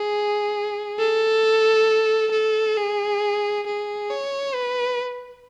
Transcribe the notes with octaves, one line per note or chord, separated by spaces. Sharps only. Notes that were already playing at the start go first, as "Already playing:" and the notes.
Already playing: G#4
A4
A4
G#4
G#4
C#5
B4